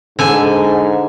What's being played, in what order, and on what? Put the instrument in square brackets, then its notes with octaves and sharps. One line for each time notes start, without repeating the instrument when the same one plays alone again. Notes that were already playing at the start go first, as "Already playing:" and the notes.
[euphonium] G#2 [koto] D3 G#5